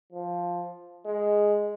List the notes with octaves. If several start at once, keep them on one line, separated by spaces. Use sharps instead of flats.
F3
G#3